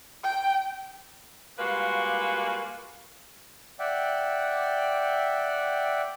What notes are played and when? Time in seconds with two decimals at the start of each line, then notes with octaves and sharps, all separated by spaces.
0.24 G5
1.59 G3 G#3 A#3 F4 F#4 B4
3.80 D5 E5 F#5 G5